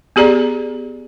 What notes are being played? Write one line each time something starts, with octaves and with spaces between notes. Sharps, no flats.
B3 G4 G#4 D5 A#5